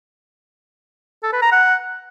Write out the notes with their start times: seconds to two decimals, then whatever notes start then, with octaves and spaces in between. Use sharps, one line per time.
1.23 A4
1.33 B4
1.42 A#5
1.52 F#5